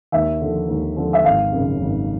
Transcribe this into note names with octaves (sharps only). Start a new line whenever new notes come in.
D#2 E5
D3 F3
D#2
D3 F3
E5
G#1 F5
F#2 C#3
G#1